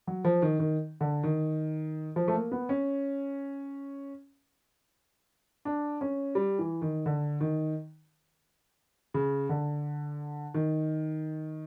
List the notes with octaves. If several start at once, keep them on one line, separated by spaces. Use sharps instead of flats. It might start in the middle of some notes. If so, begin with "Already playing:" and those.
F#3
F3
D#3
D#3
D3
D#3
F3
A3
A#3
B3
C#4
D4
C#4
G3
E3
D#3
D3
D#3
C#3
D3
D#3